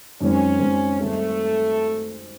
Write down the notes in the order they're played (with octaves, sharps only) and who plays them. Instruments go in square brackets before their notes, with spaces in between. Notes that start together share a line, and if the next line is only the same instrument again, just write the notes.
[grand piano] F#2 D#3 G#3 C4 [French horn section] C#4
[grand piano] F#2 D#3 G#3 C4
[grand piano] D#3 G3 C4 D#4 G#4 [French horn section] A3